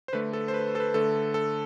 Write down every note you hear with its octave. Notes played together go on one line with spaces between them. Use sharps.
C5
D3 A3 B4
A4
C5
B4
A4
B4
D3 A3 A4
A4